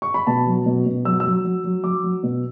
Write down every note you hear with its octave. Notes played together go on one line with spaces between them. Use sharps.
C#6
B5
B2 A5
F#3
B2
B2
F#3 E6
E6
F#3
F#3
F#3
F#3 D6
F#3
B2